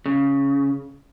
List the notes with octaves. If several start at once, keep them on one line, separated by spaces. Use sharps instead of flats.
C#3